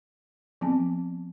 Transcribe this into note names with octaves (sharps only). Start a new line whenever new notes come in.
F3 B3 C4 A5